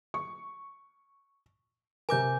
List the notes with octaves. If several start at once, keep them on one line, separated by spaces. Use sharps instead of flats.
C#6
C3 A#4 G#5 D6 G6